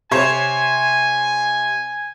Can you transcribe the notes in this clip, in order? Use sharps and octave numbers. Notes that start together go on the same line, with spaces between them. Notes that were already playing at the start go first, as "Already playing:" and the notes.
C3 C5 C#5 G#5